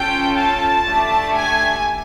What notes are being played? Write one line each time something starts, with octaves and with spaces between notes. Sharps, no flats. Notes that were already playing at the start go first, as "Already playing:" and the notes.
Already playing: C#4 F4 A4 G5
A5
A3 D4 G4
G#5